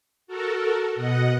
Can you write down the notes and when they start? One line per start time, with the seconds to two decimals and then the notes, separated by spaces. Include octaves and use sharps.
0.27 F#4 A4 A#4
0.95 B2 D#5 F#5